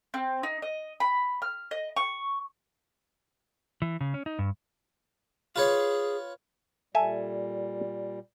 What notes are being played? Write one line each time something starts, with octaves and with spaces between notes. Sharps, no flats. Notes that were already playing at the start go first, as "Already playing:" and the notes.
C4
D#4
D#5
B5
F6
D#5
C#6
E3
C#3
C#4
D#4
G2
F4 G#4 B4 C#5
A#2 G3 A4 E5 G#5